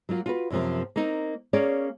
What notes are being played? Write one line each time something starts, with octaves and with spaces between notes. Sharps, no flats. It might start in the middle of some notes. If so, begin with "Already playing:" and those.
F#3 A#3 F4
F4 F#4 B4
F#2 C3 F3 A#3
A#3 C4 D#4
A#3 C#4 G#4 C#5 D5